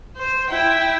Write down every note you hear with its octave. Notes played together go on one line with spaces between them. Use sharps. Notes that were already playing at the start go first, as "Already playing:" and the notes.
C5
E4 G5